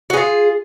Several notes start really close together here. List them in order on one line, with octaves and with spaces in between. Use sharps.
F#4 G#4 F4